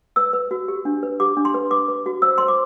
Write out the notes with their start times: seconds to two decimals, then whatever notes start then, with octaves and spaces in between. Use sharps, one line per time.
0.16 B4 E6
0.33 B4
0.51 F#4
0.68 G4
0.85 D4
1.03 B4
1.20 G4 D6
1.37 D4
1.45 C6
1.54 B4
1.70 B4 D6
1.88 B4
2.06 F#4
2.22 C5 E6
2.38 C5 C6
2.48 D6